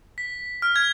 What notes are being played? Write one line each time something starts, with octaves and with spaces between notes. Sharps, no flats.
B6
F6
G#6